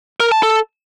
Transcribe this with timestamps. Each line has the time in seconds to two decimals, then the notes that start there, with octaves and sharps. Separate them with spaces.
0.20 A#4
0.32 A5
0.43 A4